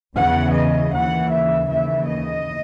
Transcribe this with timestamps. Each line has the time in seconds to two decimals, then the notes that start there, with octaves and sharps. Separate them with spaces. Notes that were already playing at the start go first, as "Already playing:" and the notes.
0.15 E2 C#3 E3 F#5
0.54 D#5
0.92 D#2 C#3 E3 F#5
1.31 E5
1.69 D#2 C#3 E3 E5
2.06 D#5